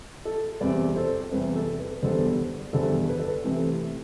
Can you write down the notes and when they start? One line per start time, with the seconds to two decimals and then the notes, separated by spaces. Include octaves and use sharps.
0.25 A4
0.61 E2 C3 G3 C4 B4 D5
0.96 A4 C5
1.31 E2 C3 G3 C4 B4
1.55 A4
1.79 B4
2.02 E2 D3 G3 B3 A4 C5
2.73 E2 D3 G3 B3 A4 C5
3.09 B4
3.19 A4
3.28 B4
3.44 C3 E3 A3 C4